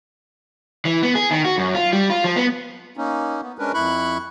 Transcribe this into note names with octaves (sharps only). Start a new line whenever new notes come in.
E3
B3
G#4
D#3
F#4
F#2
F4
G3
F4
F3
B3
A#3 C#4 D#4
B3
G#3 C#4 D4 A#4 B4
F2 E4 B5 C#6 F#6